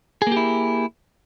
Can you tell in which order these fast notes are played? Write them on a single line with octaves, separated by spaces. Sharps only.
G#4 A#3 G4 E4